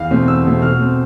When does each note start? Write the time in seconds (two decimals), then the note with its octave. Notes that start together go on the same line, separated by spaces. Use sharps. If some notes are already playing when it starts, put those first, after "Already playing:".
Already playing: E2 F5
0.11 B2 A3 C4
0.28 E2 E6
0.45 B2 A3 C4
0.62 B2 F6
0.79 A3 C4